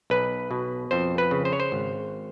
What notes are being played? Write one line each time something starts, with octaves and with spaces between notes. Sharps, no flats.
B1 B4
B2
F2 C5
B4
C#3
C5
C#5
C5
G#1